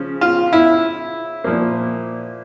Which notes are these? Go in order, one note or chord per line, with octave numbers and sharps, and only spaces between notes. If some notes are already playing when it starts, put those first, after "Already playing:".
Already playing: C#3 F3 C#4
F4
E4
A#2 F3 A#3